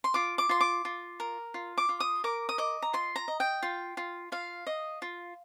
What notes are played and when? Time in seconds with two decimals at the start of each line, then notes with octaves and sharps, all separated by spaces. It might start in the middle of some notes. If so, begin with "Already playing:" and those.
0.04 C6
0.14 F4 D6
0.38 D6
0.49 F4 C6
0.61 D6
0.85 F4
1.20 A#4
1.54 F4
1.78 D6
1.89 F4
2.00 D#6
2.24 A#4 D6
2.49 D#6
2.58 D#5 D6
2.82 A#5
2.93 F4 C6
3.16 A#5
3.28 D#5
3.40 G5
3.63 F4
3.97 F4
4.32 F4 F5
4.67 D#5
5.02 F4